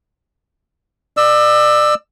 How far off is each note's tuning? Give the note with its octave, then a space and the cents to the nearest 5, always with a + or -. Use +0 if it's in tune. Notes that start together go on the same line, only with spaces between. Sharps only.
D5 +35 E6 +0